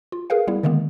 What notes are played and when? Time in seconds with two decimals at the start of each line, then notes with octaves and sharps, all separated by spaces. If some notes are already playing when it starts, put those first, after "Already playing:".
0.12 F4
0.30 G#4 A#4 B4 F5
0.48 G3 B3 E4
0.63 D3 D#3 G#3 A#3 B3